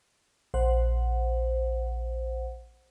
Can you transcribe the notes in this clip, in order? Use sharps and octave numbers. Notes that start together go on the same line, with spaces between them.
A#1 C5 F#5